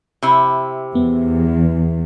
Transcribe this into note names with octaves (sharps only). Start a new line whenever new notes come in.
C3 E4
E2 B3